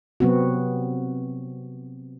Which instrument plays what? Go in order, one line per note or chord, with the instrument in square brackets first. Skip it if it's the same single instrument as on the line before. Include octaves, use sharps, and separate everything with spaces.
[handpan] C3 F#3 B3 C4 F#4